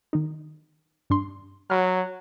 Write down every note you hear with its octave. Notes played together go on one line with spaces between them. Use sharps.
D#3 D#4
G2 D4 C6
F#3 B5 F6